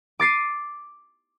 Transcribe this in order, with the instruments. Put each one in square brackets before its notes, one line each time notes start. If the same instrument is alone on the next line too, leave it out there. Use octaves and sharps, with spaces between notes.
[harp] D6 A6 C7 D#7